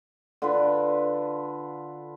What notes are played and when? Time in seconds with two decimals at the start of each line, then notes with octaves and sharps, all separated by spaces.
0.42 D3 F4 B4